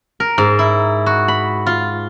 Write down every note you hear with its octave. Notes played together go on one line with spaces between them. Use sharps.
A#4
G#2
E4
F#4
B5
F4